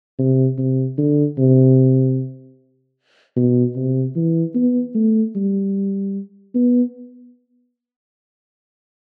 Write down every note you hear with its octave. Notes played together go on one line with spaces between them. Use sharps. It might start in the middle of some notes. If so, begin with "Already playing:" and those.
C3
C3
D3
C3
B2
C3
E3
B3
A3
G3
B3